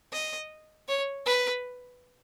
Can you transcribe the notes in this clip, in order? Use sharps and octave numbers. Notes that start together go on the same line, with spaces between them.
D#5
C#5
B4